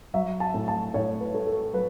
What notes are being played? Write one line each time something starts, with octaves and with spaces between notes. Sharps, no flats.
F#3 E5
A5
A2
A5
A2 C#5
B4
A3
A4
F#3 B4